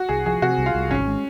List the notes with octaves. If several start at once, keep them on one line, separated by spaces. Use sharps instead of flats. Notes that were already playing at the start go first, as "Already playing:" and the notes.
Already playing: F#4
C2 G#4
F3 G#4
C3 F#4
C2
F4
C2
G#1 C#4
G#3